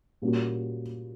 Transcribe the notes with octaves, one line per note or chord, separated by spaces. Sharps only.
A#2 G3 A#3 C#4 F#4